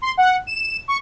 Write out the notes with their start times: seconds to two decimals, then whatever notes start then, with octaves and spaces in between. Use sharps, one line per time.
0.02 C6
0.17 F#5
0.47 E7
0.88 C#6